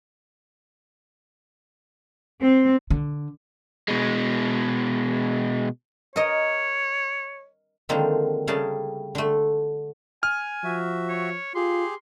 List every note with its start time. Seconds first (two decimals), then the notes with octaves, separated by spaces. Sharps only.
2.41 C4
2.90 D3
3.88 B2 G#3
6.16 A#4 C#5 D#5
7.89 D3 D#3 F3 G#3 A#3 C4
8.47 C#3 G3 A3 G#4 A#4 A5
9.15 D3 A3
10.23 G#5 F6
10.64 F3 F#4 E5
11.09 C#5
11.55 F4 G4 G#4 C6